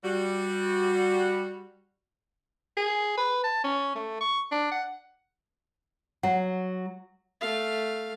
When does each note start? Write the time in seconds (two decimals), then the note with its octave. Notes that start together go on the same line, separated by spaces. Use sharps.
0.04 G3 F#4
2.77 G#4
3.17 B4
3.44 A5
3.64 C#4
3.95 A3
4.21 C#6
4.52 D4
4.72 F#5
6.23 F#3 F#5
7.41 A3 F5